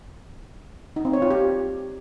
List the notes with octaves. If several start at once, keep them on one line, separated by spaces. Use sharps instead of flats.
D#4
C4
C#5
F4
G4